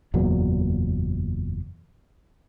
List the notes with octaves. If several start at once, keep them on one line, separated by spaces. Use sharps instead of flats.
F#1 E2 A#2 F#3